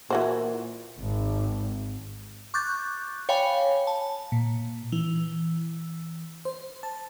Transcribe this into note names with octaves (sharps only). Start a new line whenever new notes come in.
A#2 E3 F#4 C5
G#1
C#6 D6 F#6 G6 A6
C#5 F5 G5 G#5 B5
A5
A#2
E3
C5
A5